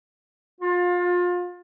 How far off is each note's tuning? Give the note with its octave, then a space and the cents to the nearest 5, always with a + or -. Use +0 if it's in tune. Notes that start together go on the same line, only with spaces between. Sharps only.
F4 +30